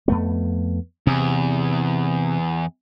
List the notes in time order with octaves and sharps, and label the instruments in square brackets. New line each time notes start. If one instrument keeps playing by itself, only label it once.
[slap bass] F2 A3 B3
[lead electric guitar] E2 [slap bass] C3